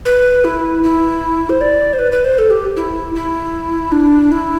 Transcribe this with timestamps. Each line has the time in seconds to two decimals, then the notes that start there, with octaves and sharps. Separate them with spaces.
0.05 B4
0.44 E4
0.83 E4
1.50 C5
1.61 D5
1.93 C5
1.99 B4
2.12 B4
2.24 C5
2.38 A4
2.50 G4
2.76 E4
3.15 E4
3.92 D4
4.32 E4